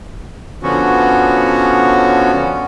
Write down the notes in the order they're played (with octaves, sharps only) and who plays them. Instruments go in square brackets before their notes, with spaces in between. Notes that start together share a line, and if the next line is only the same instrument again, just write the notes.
[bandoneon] D3 F3 B3 C#4 F#4